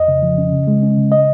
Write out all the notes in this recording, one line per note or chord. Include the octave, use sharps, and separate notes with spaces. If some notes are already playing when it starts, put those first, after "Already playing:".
Already playing: F2 D#5
C#3
F3
C#4
C#3
G#3
C#4
C#3
D#5